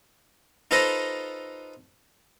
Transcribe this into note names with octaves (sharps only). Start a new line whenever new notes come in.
D#4 F4 A4 B4 C5 D#5